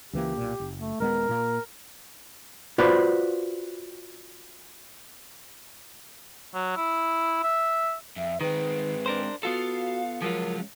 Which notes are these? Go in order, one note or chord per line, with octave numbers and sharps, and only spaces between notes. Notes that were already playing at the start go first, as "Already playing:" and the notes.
C#2 E3 A#3 G4
B1 A#2
F#1
A3
D#1 G#3 B3 A#4
A#2 A#3
F4 F#4 B4 C5 D5
F#3
E4
E5
F2 E5
D#3 G#3 C4 B4
D4 A#4 C5
B3 F4 F#4 A4 F5
F3 F#3 G#3 C#4 F4 A#4